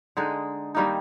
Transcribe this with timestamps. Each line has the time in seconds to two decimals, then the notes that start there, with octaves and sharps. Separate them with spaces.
0.17 D3 G#3 D#4 G#4
0.75 D#3 G3 A#3 D#4